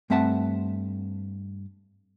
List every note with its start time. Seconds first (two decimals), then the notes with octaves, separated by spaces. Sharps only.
0.10 G2 A3 C4 E5 F#5 A5